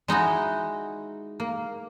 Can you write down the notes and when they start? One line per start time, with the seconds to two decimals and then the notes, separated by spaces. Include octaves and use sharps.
0.08 G#3 D#4 E4 F#4
1.40 A#3